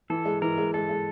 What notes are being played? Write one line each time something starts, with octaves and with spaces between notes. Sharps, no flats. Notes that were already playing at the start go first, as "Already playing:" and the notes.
E3 A4
G#3
E3 A#4
G#3
G#3 A4
G#3